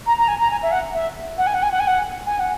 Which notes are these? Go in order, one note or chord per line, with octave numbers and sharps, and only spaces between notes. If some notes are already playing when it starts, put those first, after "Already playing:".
A#5
A#5
G#5
A#5
G#5
E5
F#5
E5
F#5
G#5
F#5
G#5
F#5
G#5
F#5
G#5
F#5